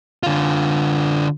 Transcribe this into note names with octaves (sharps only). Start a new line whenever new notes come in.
D3 F4